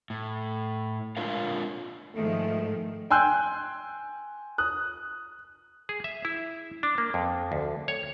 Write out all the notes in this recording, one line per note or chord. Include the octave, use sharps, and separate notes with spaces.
A2
G#3 D4 F4 A#4 C#5 F5
G#2 D#3 F3 A3
G5 G#5 C6 E6 F#6 G6
D#6 F#6
G#4
E5
E4
D4
A#3
F2
D2
C#5